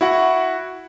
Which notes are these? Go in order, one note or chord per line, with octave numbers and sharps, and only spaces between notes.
E4 F#4 F#5